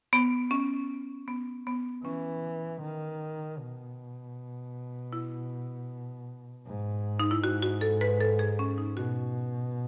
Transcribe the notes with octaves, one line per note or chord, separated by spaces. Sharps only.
B3
C#4
B3
B3
E3 C#4
D#3
B2
E4
G#2
D#4
E4
G#2 F#4
F#4
A4
B4
A4
G#4
C#4
D#4
B2 F#4